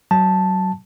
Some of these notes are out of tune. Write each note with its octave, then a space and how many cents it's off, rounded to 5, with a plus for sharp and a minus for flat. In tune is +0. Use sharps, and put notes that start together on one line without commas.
F#3 +25 A5 +0